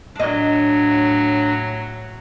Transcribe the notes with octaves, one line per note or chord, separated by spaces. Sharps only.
A2 F#3 D4 D#5